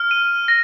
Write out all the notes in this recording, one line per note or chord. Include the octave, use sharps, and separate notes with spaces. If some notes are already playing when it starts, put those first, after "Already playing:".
Already playing: F6
D#7
A#6